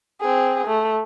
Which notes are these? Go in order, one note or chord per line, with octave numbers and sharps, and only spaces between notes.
C4 G#4
A3